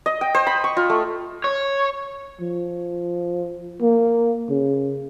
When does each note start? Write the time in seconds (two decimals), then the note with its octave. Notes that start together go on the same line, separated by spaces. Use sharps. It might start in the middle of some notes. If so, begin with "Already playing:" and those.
0.06 D#5
0.21 G5
0.35 C5
0.47 B5
0.64 C#6
0.77 F4
0.90 A3
1.44 C#5
2.41 F3
3.81 A#3
4.49 C#3